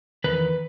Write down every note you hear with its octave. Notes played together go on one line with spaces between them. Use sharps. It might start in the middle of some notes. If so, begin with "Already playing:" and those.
E2 D#3 B4